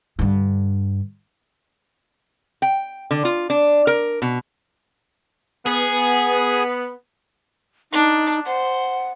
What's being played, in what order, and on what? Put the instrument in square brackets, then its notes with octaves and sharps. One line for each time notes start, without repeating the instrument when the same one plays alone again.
[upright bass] G2 D3
[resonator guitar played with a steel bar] G5
D3
F4
D4
A#4
B2
[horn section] B3 [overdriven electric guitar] G#4
[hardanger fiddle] D4 [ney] D#4
[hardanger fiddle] C5 [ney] F#5